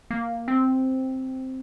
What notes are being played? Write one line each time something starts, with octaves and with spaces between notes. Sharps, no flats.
A#3
C4